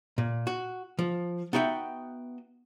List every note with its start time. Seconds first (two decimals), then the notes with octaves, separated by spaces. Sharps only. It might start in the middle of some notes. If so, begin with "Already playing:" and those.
0.18 A#2
0.47 F#4
0.99 F3
1.53 B3 D#4 F#4 E5 G5